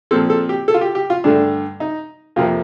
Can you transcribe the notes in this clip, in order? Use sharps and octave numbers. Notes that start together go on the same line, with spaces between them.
A#2 F3 C4 A4
A4
G4
A4
F4
G4
G4
F4
G2 D3 A3 D4
D#4
F2 C3 F3 A#3 F4